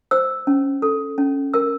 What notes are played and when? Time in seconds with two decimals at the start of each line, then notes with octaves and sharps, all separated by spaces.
0.11 C5 E6
0.47 C#4
0.82 A4
1.18 C#4
1.54 A#4 E6